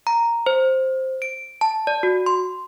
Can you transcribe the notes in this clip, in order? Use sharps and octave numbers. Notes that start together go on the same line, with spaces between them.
A#5
C5
D7
A5
D5
F#4
C6